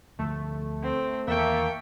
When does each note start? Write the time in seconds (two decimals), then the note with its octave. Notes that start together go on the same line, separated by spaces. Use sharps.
0.19 D2 D3 F3 A3
0.83 C4
1.28 E2 D#3 A#3 E5 G5 A5 C#6